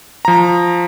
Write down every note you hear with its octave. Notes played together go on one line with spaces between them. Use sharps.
F3 A#5